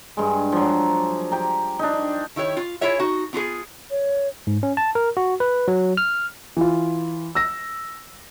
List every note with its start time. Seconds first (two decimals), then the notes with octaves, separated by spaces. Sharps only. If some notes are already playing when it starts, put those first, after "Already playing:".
0.17 G2 G#3
0.52 F3 F#3
1.32 G4 A#5
1.79 D4 D#4
2.36 D#3 E4 G4 C#5
2.57 F4
2.81 E4 F4 G#4 C#5 E5
2.99 D#4 F#4
3.33 B3 F4 F#4 G#4
3.91 C#5
4.47 G#2
4.63 C#4
4.77 A5
4.95 A#4
5.17 F#4
5.40 B4
5.68 F#3
5.97 F6
6.57 E3 F4
7.35 E6 A#6